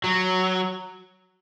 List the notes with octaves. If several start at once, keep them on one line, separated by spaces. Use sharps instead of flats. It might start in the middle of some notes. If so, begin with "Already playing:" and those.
F#3